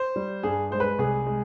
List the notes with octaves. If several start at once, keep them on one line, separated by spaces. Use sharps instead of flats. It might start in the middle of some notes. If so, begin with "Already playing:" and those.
Already playing: C5
G3
G2 G#4
G#3 C5
B4
C2 G#4
G#3